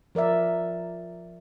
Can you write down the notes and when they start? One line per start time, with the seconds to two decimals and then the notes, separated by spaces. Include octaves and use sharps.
0.15 F3 A#4 D5 E5